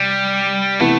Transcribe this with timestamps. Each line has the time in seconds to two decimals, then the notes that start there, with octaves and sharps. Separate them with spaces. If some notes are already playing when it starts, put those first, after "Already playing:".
Already playing: C3 G3
0.80 C3 E3 A3 B3 E4